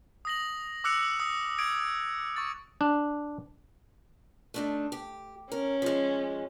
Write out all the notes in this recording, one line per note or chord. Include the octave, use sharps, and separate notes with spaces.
D#6 A#6 F#7
D6 E6 F#6 C#7 F7
D#6
D#6 G#6 D7
C#6 A6
D4
A3 D4 D#4
G4
C#4 A#4
F3 G#3